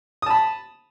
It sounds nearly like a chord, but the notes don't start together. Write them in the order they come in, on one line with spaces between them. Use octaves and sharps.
D#6 A5 B5